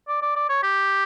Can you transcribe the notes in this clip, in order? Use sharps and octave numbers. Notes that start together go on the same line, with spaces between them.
D5
D5
D5
C#5
G4